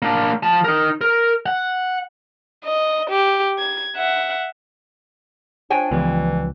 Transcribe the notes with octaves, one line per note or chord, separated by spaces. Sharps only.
A#3 D4
F3 A5
D#4 A#4
A#4
F#5
D#5
G4
G#6
E5 F#5
F3 D4 C#5 G5 G#5
C#2 G2 E3 F3 B3